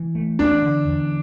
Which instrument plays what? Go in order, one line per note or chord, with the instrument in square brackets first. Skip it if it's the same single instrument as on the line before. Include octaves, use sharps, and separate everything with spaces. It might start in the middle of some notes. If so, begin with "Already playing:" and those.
Already playing: [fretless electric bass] E3
A3
[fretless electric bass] E2 [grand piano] D4
[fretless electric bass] D3
E2